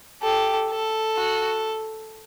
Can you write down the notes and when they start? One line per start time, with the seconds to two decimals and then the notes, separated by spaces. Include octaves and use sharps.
0.22 G4 A4
0.70 A4
1.17 F#4